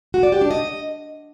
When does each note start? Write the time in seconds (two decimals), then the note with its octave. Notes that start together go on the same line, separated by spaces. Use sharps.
0.14 F#4
0.23 D5
0.32 G4
0.41 D4
0.51 D#5